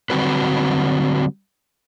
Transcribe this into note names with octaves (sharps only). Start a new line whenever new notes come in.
D3 F#3 G3 C4 F#4 B4